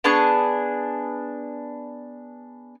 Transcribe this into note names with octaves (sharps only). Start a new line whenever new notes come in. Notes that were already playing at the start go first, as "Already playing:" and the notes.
B3 D4 G#4 C#6